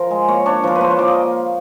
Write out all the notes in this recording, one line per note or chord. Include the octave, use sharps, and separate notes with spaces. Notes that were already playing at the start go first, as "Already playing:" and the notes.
Already playing: F3 A#4
G#3
A#3 C#5
D4 C#5
F3 A#4
B4
A#3 C5
C#5
F3 D5
D#5